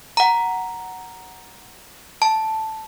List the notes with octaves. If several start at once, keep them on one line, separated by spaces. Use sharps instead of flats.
F#5 A#5
A5